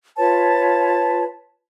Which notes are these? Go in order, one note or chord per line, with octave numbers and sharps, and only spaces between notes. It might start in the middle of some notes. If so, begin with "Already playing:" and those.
F4 B4 C#5 A5